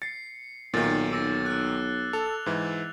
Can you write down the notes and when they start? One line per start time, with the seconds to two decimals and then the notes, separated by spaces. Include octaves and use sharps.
0.02 A6 C7 C#7
0.74 B1 A#2 D#3 A6
1.11 D6 E6 A#6
1.46 F6 F#6
2.13 A4 F7
2.46 G#2 E3